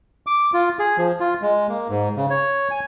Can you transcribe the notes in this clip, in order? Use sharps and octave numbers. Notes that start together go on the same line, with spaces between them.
D6
F4
G#4
F3
F4
G#3
A#3
G#2
C#3
C#5
G#5